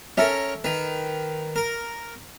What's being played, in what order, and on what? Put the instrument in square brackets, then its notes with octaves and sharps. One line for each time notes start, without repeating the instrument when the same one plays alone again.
[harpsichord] C#4 A#4 [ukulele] A4 E5
[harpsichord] D#3 B4
A#4